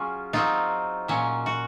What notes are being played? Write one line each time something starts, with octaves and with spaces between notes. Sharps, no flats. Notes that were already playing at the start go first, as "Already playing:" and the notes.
Already playing: F#3 C#4 F4 G#4
F#3 C4 D#4 F4
A#2 F#3 C#4
F#4